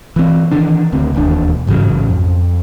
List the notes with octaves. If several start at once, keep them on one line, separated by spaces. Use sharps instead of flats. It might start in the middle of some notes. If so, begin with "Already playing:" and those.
E3 C4
D#3 E3 D4
D2 D3 C4
E1 D#2 D4
A1 G#2 C#3 F#3
F2